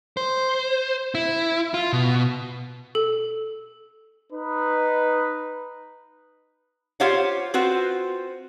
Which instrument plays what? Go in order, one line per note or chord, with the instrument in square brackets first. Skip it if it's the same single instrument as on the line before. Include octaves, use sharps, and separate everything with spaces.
[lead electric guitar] C5
E4
F4
B2
[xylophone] A4
[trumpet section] D#4 B4
[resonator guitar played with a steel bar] F4 G4 C5 C#5 F5 F#5
C4 F4 F#4 B4 C5